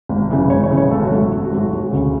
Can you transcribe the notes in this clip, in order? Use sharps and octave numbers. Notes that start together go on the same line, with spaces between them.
G#1
F#2 C#3 E3
G#1 C#5
C#5
F#2 C#3 E3
C#5
G#1 A4
F#4
G#2 F#3 A3
G#1
F#4
G#2 F#3 A3
F#4
E1 F#4
D2 C#3